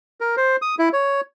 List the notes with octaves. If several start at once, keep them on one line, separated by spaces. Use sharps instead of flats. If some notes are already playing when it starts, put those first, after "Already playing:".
A#4
C5
D#6
E4
C#5